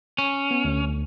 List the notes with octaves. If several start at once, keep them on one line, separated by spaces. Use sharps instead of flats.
C#4
B3
D2